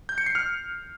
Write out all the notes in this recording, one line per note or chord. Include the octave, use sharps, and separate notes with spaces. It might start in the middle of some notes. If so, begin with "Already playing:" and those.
G6
C#7
C7
F6